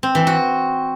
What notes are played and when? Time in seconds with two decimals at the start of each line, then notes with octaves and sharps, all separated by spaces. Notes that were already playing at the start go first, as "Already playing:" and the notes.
0.03 C4
0.15 E3
0.27 F#4